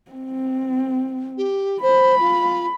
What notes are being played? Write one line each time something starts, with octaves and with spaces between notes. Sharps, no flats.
C4
G4
C5 B5
F4